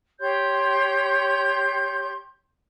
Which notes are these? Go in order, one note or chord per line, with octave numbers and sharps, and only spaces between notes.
G4 C#5 C6 G6